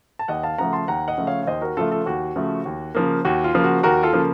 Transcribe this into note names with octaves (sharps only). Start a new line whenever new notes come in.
A5
D#2 D#5 F#5
F5 A5
C#3 F3 A3 F#5 A#5
A5 C6
D#2 F#5 A#5
D#5 F#5
C#3 F3 A3
C#5 F5
F5
D#2 C5 D#5
F#4 A#4
C#3 F3 A3 F4 A4
F4 A4
D#2 F#4
C#3 F3 A3
D#2
C#3 F3 A#3
D#2 F#4
F4
C#3 F3 A#3
F#4
D#2 F#4 A#4
F4 A4
C#3 F3 A#3